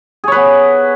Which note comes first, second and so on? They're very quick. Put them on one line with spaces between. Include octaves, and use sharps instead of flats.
G#4 C#5 B4 B3